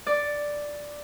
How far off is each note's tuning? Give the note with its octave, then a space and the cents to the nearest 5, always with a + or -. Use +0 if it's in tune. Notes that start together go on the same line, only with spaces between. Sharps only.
D5 +0 C#6 +30